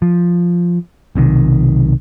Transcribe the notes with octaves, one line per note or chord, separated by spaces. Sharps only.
F3
B1 C3 D#3